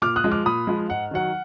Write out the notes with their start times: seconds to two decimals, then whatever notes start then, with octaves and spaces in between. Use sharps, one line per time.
0.02 A#2 D6 F6
0.16 D#6 F#6
0.24 F3 G#3
0.32 D6 F6
0.45 A#2 B5 D#6
0.67 F3 G#3
0.89 G#2 F#5
1.11 D#3 F#3 F#5